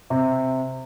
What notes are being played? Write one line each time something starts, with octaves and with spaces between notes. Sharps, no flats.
C3